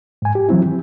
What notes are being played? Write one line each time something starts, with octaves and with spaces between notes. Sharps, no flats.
G#2 G#5
G4
E3 F#3 C4 E4
E3